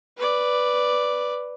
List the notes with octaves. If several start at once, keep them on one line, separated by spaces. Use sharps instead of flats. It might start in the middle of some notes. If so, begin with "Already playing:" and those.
B4 D5